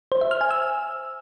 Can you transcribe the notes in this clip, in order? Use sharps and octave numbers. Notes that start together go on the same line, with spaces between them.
C5
E5
F6
G#5
E6